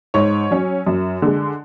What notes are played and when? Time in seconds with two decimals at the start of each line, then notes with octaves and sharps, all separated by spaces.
0.14 G#2 C#5
0.51 F#3 C#4
0.87 F#2
1.22 D3 G#3